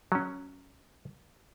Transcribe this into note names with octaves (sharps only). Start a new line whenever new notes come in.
F#3 C#4